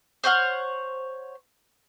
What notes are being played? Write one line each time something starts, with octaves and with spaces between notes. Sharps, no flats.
C5 C#5 F#5 F6